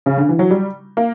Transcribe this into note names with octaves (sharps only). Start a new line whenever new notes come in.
C#3
D3
E3
F#3
G3
A#3